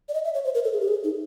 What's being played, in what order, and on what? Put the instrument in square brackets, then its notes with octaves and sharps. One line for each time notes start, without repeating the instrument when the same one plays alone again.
[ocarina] D5
D#5
E5
C#5
C5
A#4
A4
G#4
G4
G#4
D#4